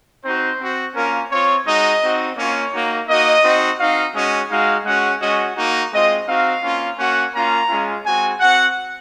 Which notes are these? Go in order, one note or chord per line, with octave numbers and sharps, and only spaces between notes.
C4 D#4 F#4 C5
C4 F#4
A#3 C#4 F4 A#4
C4 F4 C#5
G#3 D#4 F#4 D#5
C4 D#4 F#4
A#3 C#4 F4 C#5
A#3 D#4 F#4
A#3 D#4 F#4 D#5
C4 D#4 F#4
C4 D#4 F#4 F5
G#3 C#4 F#4 D#5
G#3 D#4 F#4 F5
G#3 C#4 F#4 F#5
G#3 C#4 F#4 D#5
A#3 D#4 F#4
G#3 C4 F4 D#5
C4 D#4 F#4 F5
A#3 C#4 F4
A#3 C#4 F#4 F#5
A#3 C#4 F4 A#5
G#3 C#4 F4
G#3 C4 F#4 G#5
C4 F#4 F#5